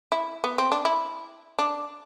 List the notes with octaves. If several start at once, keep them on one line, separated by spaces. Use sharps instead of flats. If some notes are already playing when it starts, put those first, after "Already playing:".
E4
B3
C4
D4
E4
D4